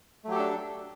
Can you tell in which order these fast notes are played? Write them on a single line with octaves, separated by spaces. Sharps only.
A3 F#3 G4 A4 D4